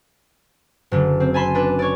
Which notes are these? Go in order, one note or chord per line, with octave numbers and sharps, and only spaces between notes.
F#1 D3
C4
G#5 A5 B5 C6
D4 B4
C#5 D5